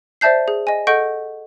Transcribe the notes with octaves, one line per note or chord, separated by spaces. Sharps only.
C5 D5 E5 A5 G6 C7
G#4
D#5 G#5
A4 D#5 F#5 C#6 G6 D7